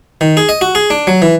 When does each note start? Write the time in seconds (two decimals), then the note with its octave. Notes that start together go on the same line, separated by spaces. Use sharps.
0.21 D#3
0.37 G#4
0.49 D#5
0.61 F#4
0.75 G#4
0.90 D4
1.07 F#3
1.22 E3